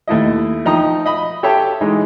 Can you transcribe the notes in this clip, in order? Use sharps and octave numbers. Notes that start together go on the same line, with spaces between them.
D#2 A3 E4 D#5
F3 D#4 G5 A#5 D#6
D#5 B5
G4 A4 C#5 E5 G5 A5
E3 G#3 D#4